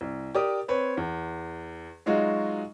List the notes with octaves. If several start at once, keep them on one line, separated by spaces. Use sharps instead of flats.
C2
G4 A#4 D5 D#6
C4 B4 C#5
E2
F#3 G#3 D#4 F4 F#4